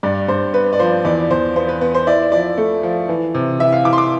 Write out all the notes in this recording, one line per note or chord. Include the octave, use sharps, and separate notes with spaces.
G2 D5
G2 C5
B3 B4
D5
F3 C5
E2 D5
E2 C5
B3 C5
B4
B3
C5
E4 D5
F3 D5
A3
F3
E3
C3
E3 E5
F5
E3 D6
C6
D6